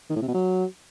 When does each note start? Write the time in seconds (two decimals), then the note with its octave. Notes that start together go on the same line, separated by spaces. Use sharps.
0.10 D#3
0.16 A2
0.22 C3
0.28 B2
0.34 F#3